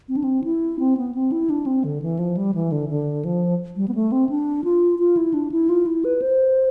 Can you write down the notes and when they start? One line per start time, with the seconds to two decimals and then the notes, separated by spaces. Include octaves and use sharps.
0.08 C4
0.17 D4
0.24 C4
0.44 E4
0.79 C4
0.97 B3
1.15 C4
1.32 E4
1.50 D4
1.66 C4
1.84 D3
2.02 E3
2.19 F3
2.37 G3
2.55 E3
2.72 D3
2.89 D3
3.25 F3
3.76 G3
3.88 B3
3.95 A3
4.12 C4
4.29 D4
4.64 F4
4.99 F4
5.17 E4
5.34 D4
5.52 E4
5.69 F4
5.86 E4
6.05 B4
6.22 C5